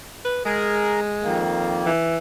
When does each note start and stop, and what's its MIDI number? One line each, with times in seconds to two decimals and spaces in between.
0.25 0.43 71
0.45 1.41 56
0.45 1.00 68
0.45 1.00 70
1.23 1.91 41
1.23 1.91 51
1.23 1.91 58
1.86 2.17 52